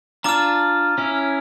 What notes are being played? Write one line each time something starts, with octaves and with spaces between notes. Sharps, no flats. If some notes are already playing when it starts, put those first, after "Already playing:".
D4 F4 A#5 D6 F6
C#4 E4